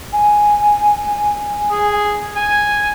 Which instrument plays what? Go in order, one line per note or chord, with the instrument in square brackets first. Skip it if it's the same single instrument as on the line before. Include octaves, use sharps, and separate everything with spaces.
[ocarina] G#5
[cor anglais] G#4
G#5